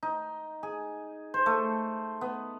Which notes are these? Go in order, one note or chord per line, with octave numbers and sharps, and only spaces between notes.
D#4
G#4
C5
A3
B3